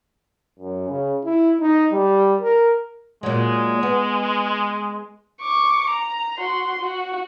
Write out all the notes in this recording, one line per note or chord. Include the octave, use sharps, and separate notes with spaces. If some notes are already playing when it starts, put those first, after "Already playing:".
F#2
C#3
E4
D#4
G3
A#4
A#2 F#3 G#3
B3
C#6 D6
A#5
F#4 C6
F#4